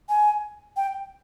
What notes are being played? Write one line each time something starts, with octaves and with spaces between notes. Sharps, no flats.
G#5
G5